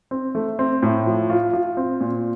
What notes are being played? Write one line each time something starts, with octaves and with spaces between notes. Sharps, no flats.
C4
A3
C4
A2
F3
F4
F4
C4
A#2